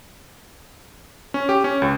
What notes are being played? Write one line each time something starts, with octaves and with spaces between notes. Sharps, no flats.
C#4
G4
C#4
C#2